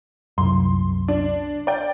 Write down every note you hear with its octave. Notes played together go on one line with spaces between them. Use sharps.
C2 F#2 C6
D4
D5 G5